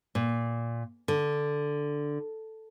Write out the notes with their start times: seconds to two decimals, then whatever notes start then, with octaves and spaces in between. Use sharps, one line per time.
0.15 A#2
1.08 D3